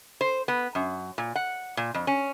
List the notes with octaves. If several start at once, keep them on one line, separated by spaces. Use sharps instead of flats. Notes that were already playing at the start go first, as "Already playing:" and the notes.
C5
B3
F#2
A#2
F#5
A#2
F2
C#4